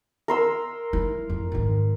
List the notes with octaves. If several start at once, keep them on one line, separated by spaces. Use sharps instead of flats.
A#4 C6 E6
E4
F2
G#2 D#3